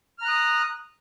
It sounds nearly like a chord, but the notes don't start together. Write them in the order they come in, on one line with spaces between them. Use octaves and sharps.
F6 A#5 F#6 D#6